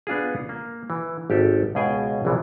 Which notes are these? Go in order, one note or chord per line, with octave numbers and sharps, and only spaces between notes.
B3 D4 F4 G#4
A#3
E3
G#1 G4 A4
C#2 B2 G#4 G5 G#5
A#1 C3 E3 F3